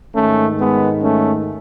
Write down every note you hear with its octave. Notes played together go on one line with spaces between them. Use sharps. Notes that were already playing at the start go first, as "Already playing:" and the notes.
G#2 D#3 A3 C#4
G#3 B3
A3 C#4